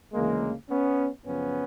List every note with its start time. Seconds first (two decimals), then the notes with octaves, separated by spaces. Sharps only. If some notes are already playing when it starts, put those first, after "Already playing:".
0.13 D2 C#3 E3 G#3 A#3
0.69 B3 C#4
1.24 F#2 C#3 F3 B3 C#4